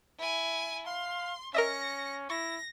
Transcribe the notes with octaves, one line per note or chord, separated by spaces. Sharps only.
E4 G#5
F5 C6
C#4 A#4 D#5 E5 A#6 C#7
E4 C#6 A#6